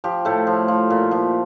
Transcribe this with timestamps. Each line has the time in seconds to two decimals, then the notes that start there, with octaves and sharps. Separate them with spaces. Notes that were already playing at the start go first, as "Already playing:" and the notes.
0.04 F3 G4
0.25 A2 A3
0.47 F3
0.68 F3
0.90 A#2
1.11 F3